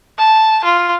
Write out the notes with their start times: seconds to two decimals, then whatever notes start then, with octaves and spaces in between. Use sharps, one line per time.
0.19 A5
0.64 F4